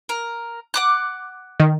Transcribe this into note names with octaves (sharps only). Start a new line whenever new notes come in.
A#4
F#5 D6 F#6
D#3